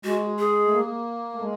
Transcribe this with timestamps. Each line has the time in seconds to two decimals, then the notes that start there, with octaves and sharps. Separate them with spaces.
0.04 G#3 F#4
0.39 G#4
0.66 A3
0.73 A#3
1.34 A3
1.41 G#3